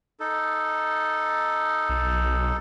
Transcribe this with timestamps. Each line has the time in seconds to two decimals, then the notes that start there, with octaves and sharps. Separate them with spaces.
0.20 D#4 A4
1.89 B1